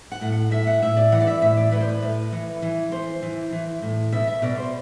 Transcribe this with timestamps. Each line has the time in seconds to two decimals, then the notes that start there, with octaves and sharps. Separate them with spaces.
0.12 F#5
0.21 A2
0.32 F#5
0.51 A2 E5
0.67 F#5
0.82 A2 E5
0.97 D5
1.12 E3 F#5
1.20 D5
1.27 E5
1.42 A2 E5
1.57 D5
1.72 A2 B4
1.80 C5
1.89 B4
2.02 A2
2.32 E3
2.62 E3
2.92 E3 C5
3.22 E3
3.52 E3
3.82 A2
4.12 B2 E5
4.27 E5
4.42 B2 D5
4.58 C5